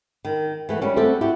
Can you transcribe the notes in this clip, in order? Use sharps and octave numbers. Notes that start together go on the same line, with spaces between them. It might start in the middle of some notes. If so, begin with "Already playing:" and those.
D#3
E3 A3 B3
G3 G#3 C#4
A3 C4 F#4 G4 A4
E4 F#4 G4